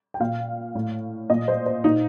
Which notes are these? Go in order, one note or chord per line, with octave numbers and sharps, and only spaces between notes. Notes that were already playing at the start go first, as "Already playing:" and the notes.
G5
A#2 F5
A2
A#2 D#5
C5
C5
A#2 D#4